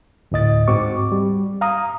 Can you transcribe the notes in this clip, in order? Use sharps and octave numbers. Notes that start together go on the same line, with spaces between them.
D2 A2 D#5 A6
G#2 C4 F#4 C#6 D6
G3
F5 A#5 D#6